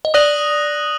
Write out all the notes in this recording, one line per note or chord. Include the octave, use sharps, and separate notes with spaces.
D#5
D5 D#6 F#6 A#6 D#7 F#7